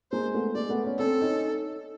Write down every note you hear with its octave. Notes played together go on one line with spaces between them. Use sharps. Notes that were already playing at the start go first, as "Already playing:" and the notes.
G#3 A#3 C5
A3 B3
G#3 A#3 D5
A3 B3
B3 C#4
C4 D4 A4
C#4 D#4